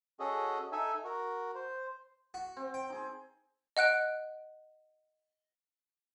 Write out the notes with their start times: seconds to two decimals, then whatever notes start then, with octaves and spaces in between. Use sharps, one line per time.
0.20 C#4 F#4 G#4 A4 D#5
0.72 D#4 A4 E5 G#5
1.04 F#4 A#4
1.55 C5
2.34 F#4
2.57 C4
2.74 G5
2.90 D#4 G#4
3.77 D#5 F#5 F#6 D7